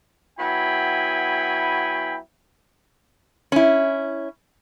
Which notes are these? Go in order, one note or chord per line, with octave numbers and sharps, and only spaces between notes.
F#3 B3 E4 G5 G#5 B5
C#4 E4